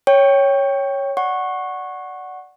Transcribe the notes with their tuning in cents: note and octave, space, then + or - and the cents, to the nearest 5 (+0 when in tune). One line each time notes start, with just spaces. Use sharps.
C#5 +0 G5 +0 C#6 +0
D5 +0 F#5 +0 C#6 -15